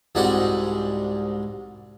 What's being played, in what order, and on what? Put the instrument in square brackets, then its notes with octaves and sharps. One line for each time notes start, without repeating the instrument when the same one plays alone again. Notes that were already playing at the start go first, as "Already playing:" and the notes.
[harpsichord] C2 G#2 G3 G#3 F#4 F#5